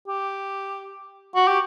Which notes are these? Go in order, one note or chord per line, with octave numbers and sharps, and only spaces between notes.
G4
F#4
G4